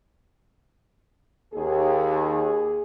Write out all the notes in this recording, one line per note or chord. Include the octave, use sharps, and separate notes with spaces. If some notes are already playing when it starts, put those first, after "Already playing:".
D#2 G#4